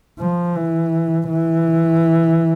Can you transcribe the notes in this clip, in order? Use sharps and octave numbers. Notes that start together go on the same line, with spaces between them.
F3
E3
E3